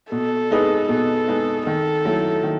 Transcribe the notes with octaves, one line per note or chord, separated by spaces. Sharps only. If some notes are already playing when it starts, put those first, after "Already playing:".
B2 A4
G#3 D#4 G#4 B4
B2 A4
G#3 D#4 G#4 B4
D#3 A4
F#3 A3 E4
D#3